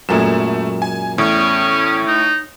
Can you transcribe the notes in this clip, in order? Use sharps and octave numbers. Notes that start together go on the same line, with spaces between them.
F#2 A#2 G#3 A3 E7
G#5
E2 A2 C#4
D#4